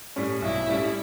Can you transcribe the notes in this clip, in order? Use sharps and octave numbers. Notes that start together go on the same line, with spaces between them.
A2 G3 C#4
B1 E4
A2 G3 C#4